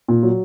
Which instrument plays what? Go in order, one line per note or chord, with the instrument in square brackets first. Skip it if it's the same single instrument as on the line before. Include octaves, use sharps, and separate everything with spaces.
[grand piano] A#2
F#3